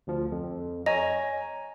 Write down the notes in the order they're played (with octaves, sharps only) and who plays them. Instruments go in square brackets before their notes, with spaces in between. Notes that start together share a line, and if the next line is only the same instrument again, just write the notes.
[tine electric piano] D2 F3
F2
[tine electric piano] C#5 G#5 A#5 [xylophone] D#5